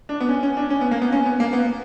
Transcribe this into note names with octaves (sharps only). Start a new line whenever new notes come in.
D4
B3
C#4
C#4
D4
C#4
B3
A#3
B3
C#4
B3
A#3
B3